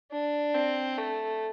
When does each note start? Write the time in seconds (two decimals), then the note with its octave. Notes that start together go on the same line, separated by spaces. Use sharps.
0.12 D4
0.55 C4
0.98 A3